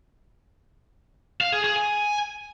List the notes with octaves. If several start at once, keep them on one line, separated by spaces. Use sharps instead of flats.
F5
G#4
G#4
G#5